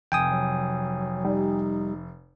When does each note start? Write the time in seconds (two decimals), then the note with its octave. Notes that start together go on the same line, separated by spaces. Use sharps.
0.12 F1 G5 G#5 D#6
0.26 F#3
1.25 G3 D#4